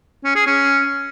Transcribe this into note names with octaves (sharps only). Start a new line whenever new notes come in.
C#4
G#4
C#4